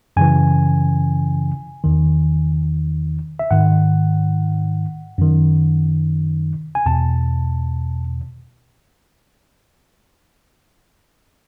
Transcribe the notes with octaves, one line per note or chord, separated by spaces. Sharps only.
F#2 C#3 E3 G#5
E2 D#3
E5
G#2 D#3 F#5
F#2 D#3
G#5
E2 B2 A5